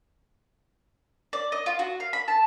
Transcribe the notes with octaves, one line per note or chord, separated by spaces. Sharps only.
D5
D#5
F4
F#4
F5
B5
A5